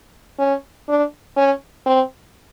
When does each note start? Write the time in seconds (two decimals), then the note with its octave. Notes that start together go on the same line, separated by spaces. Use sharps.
0.39 C#4
0.89 D4
1.37 C#4
1.86 C4